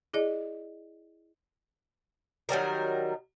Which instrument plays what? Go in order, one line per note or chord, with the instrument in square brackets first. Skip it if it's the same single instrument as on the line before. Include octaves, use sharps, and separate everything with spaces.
[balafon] E4 G#4 D5 D#5
[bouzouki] D#3 F#3 G3 A#4